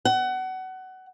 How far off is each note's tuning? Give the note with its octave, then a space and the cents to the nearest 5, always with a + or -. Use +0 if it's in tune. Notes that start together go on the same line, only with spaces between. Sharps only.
F#5 +25